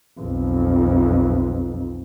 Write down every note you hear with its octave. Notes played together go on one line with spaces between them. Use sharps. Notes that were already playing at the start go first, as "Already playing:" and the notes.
B1 F2